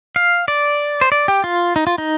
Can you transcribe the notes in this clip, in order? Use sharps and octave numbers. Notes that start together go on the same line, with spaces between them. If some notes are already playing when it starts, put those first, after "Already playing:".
F5
D5
C5
D5
G4
F4
D#4
F4
D#4